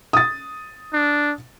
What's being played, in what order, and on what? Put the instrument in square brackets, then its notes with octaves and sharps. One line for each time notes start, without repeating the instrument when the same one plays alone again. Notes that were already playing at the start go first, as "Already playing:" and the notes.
[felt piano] D#6 A6
[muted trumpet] D4